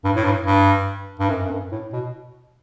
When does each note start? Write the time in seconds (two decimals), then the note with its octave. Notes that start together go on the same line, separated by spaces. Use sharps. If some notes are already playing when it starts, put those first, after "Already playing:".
0.04 G2
0.16 A2
0.24 G2
0.46 G2
1.19 G2
1.30 F#2
1.45 F#2
1.51 G2
1.72 A2
1.93 B2